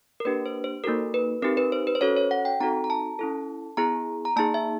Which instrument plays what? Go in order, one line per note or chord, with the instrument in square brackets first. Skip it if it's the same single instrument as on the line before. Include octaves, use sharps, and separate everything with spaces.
[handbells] A#4
A#3 D4 G4 B4
C5
C5
A#3 D#4 F#4 A4 A#4
B4
C4 D#4 G4 A#4
B4
C5
B4
C5
C#4 F#4 A4 C#5
C#5
F#5
G5
C4 D#4 F#4 A4 A#5
A#5
A5
C#4 E4 A4
B3 E4 G#4 A#5
A#5
A#3 D#4 G#4 A5
E5